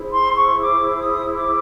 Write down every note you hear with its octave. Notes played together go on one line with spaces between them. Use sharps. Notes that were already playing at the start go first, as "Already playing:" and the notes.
Already playing: E4 G#4 C5
C6
C#6
D6
D#6
D6